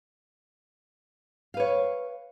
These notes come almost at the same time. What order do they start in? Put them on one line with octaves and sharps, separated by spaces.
F5 B4 C#5